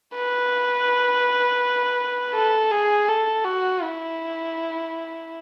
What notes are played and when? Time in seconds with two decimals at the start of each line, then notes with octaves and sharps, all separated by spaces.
0.14 B4
2.34 A4
2.71 G#4
3.08 A4
3.45 F#4
3.82 E4